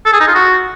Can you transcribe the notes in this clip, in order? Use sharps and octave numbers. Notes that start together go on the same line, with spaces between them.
A4
G#4
D#4
F4
F#4